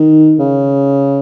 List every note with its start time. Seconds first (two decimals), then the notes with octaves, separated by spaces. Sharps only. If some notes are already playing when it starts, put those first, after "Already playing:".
Already playing: D#3
0.39 C#3